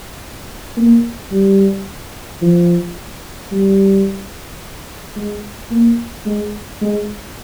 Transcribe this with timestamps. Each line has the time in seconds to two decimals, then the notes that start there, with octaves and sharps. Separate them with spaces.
0.77 A#3
1.31 G3
2.42 F3
3.52 G3
5.16 G#3
5.71 A#3
6.26 G#3
6.81 G#3